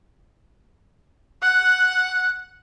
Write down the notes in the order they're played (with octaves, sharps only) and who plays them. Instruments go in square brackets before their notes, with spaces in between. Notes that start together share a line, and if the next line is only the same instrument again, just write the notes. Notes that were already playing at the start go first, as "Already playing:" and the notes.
[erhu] F#5 [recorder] F#6